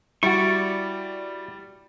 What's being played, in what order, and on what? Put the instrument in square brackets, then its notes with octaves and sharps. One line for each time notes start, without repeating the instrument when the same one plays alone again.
[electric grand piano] G3 [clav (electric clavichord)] E4 F#4 [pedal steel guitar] D5 C#6